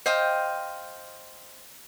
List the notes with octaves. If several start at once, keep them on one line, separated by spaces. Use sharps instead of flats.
C5 D#5 F5 G5